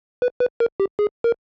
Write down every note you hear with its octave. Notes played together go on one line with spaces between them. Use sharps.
B4
B4
A#4
G4
G#4
A#4